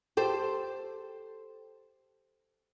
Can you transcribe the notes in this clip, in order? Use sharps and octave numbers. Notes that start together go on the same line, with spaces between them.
G4 A4 C5